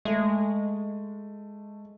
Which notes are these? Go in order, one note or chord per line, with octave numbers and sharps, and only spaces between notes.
G#3 A3